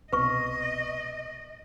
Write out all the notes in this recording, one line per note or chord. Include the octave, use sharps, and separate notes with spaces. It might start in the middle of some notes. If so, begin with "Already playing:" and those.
C2 B2 B4 D#5 C#6